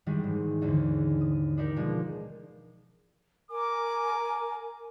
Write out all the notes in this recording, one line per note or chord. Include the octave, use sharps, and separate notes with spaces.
D#3 E3 G3 G#3 F#4
G#2
D#2 G#2 D3 E3
D#6
D4 D#4 G4 A#4 D5
B2 F3 G#3 A#3
A#4 G#5 D6